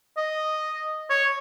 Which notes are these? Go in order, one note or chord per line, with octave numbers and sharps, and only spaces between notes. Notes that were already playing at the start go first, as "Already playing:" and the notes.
D#5
C#5